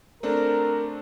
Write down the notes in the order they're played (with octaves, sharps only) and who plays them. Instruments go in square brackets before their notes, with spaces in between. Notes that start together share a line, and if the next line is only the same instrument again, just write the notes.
[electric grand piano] A3 C4 D4 [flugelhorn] A#4